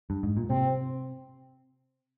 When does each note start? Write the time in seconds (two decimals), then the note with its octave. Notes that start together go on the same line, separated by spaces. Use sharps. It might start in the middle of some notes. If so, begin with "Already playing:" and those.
0.10 G2
0.23 G#2
0.37 A#2
0.50 C3 C4